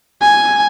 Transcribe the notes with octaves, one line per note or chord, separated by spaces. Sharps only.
G#5